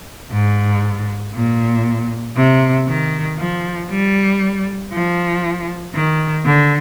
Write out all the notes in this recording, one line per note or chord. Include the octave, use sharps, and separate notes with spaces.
G#2
A#2
C3
D#3
F3
G3
F3
D#3
D3